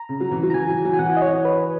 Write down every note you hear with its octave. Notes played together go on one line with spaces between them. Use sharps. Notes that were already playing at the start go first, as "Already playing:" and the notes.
Already playing: A#5
C#3
F#3
E3
F#3
A#5
E3 G#5
F#3
F#3
G#5
E3 F#5
D#5
C#5
B4